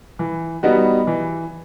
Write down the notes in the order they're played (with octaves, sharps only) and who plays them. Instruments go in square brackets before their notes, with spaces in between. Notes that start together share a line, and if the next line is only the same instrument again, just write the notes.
[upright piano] E3
G3 B3 D#4 F#4
E3